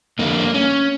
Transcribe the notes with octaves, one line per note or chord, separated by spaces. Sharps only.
F2 D3 G3 A#3
C#4